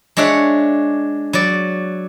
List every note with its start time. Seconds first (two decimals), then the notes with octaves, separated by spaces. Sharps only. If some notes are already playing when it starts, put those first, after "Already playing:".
0.17 G#3 D4 C#5 E5 F#5
1.33 F#3 D5